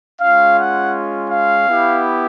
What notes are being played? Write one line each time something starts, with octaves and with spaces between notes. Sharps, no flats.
G#3 C#4 F4 F5
F#5
F5
B3 E4 G4